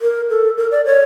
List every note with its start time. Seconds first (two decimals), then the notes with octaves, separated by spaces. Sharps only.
0.02 A#4
0.30 A4
0.58 A#4
0.71 D5
0.85 C#5